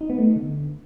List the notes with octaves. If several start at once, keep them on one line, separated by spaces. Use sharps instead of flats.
D#4
B3
A3
D#4
D3